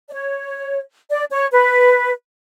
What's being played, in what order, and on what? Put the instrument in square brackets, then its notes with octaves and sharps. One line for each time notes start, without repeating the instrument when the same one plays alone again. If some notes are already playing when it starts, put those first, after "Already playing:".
[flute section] D5
C#5
D5
C#5
B4